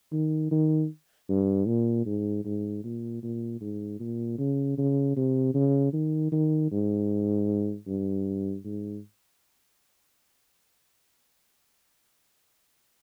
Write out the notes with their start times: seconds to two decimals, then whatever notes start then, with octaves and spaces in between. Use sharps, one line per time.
0.12 D#3
0.51 D#3
1.29 G2
1.67 A#2
2.06 G#2
2.45 G#2
2.84 A#2
3.23 A#2
3.61 G#2
3.99 A#2
4.38 C#3
4.78 C#3
5.16 C3
5.54 C#3
5.93 D#3
6.32 D#3
6.72 G#2
7.87 G2
8.64 G#2